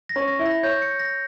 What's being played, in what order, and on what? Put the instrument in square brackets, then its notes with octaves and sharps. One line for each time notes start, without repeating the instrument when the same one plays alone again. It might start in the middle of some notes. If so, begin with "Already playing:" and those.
[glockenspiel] A#6
[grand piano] C#4
[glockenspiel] A#6
[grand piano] E4
[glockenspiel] A#6
[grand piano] C#5 [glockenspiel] G6
[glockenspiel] C#7
A#6